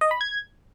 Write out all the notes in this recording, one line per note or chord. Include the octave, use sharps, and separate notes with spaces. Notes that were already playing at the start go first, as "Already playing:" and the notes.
D#5
B5
G#6